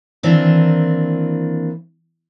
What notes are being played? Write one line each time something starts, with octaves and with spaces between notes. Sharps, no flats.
D#3 E3 A#3 C4 D4